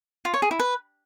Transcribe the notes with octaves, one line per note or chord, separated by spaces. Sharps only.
F4
C#5
G#4
E4
B4